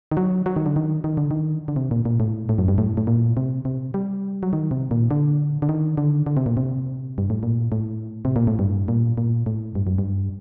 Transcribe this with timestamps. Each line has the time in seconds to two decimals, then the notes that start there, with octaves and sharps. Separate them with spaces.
0.11 D#3
0.17 F#3
0.46 F#3
0.56 D#3
0.66 D3
0.76 D#3
1.04 D#3
1.17 D3
1.31 D#3
1.68 D3
1.76 C3
1.91 A#2
2.05 A#2
2.20 A2
2.49 A2
2.58 F#2
2.68 G2
2.78 A2
2.97 A2
3.07 A#2
3.37 C3
3.65 C3
3.94 G3
4.43 F#3
4.53 D#3
4.71 C3
4.91 A#2
5.11 D3
5.62 D3
5.69 D#3
5.97 D3
6.26 D3
6.37 C3
6.46 A#2
6.57 C3
7.18 G2
7.30 A2
7.43 A#2
7.72 A2
8.25 C3
8.36 A#2
8.47 A2
8.59 G2
8.88 A#2
9.18 A#2
9.46 A2
9.75 G2
9.87 F#2
9.98 G2